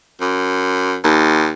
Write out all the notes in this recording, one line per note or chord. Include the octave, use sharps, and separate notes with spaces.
F#2
D#2